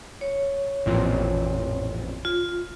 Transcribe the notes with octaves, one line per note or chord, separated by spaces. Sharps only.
C#5
A1 F2 A#2
F4